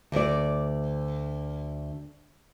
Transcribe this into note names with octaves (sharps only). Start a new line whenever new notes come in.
D2 D5